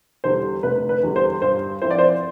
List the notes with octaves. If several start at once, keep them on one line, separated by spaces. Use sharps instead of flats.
E2 D3 G3 C5
F1 B4
B4
E2 D3 G3
C5
G2 C5
F3 C4 E4 C5
D5
C5